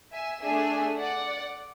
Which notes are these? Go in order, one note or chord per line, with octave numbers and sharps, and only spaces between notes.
E5 G#5
A3 D4 G#4 E5 G#5
D5 F#5